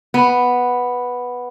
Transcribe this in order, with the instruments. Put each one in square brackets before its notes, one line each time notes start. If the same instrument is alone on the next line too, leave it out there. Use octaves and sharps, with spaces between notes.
[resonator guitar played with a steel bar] B3